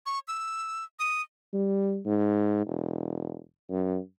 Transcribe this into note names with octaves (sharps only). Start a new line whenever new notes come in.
C#6
E6
D#6
G3
G#2
E1
F#2